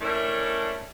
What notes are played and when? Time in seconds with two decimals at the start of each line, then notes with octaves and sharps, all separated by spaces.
0.01 A3 C#4 D4 E4 A#4